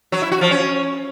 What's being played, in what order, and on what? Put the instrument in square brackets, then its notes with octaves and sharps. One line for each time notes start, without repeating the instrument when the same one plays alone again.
[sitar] F#3
E4
F#4
F3
C#4